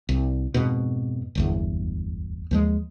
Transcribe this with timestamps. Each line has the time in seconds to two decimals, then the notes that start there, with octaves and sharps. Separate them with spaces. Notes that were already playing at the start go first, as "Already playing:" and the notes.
0.09 C2
0.54 F2 G#2 B2
1.35 D1 G1 E2
2.51 D#2 F3 G#3